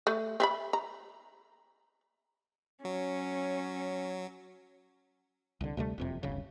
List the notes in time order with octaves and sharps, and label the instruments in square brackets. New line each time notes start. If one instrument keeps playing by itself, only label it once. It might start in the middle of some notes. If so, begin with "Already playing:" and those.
[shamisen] A3
C4 E5 B5
A#5
[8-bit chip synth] F#3 [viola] C#4
[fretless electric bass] C2 D3
D2 C3 G3 A3
F#1 F2 C3
D1 G1 C#3